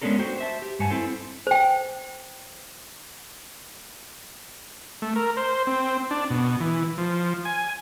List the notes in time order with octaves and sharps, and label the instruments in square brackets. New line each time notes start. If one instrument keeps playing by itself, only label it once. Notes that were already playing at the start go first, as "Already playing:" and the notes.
[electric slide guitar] G#3 B3 C#4 D4 A4 A#4
F#4 C5 G5
C5 E5 A5
G4
G2 G3 F#5 G#5 A5
C4 E4 A4 C5
[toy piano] C5 G5
[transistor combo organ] A3
A#4
C5
C4
D4
B2
E3
F3
G#5